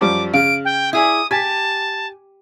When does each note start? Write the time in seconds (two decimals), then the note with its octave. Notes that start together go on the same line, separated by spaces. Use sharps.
0.01 F#2 F3 G3 D6
0.33 C#3 F5 D7
0.65 G5
0.93 E4 G#4 D5 D#6
1.31 G4 G#5 A5